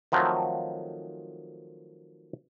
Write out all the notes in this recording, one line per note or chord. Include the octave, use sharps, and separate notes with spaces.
D#3 F3 F#3 A3 C4